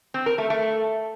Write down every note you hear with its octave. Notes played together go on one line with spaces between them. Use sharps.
C4
A#4
A3
A3